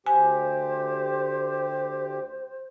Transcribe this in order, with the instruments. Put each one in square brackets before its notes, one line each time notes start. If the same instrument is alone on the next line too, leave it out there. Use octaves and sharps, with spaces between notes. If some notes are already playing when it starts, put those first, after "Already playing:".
[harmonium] D2 G4 [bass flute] C5 [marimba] G#5